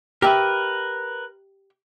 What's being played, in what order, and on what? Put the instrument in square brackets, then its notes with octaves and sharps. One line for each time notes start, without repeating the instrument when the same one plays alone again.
[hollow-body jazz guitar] G4 E5 [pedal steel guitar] A#4 B4